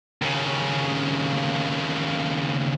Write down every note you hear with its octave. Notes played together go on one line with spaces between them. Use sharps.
D#2 C#3